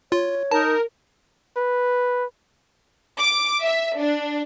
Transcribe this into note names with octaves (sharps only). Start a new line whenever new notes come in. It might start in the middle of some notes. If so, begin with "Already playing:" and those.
F4 C#5
D#4 A#4 A5
B4
D6
E5
D4